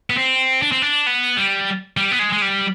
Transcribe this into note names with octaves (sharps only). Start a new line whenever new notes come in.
B3
C4
D4
C4
D4
B3
G3
G3
B3
G#3
G#3
G3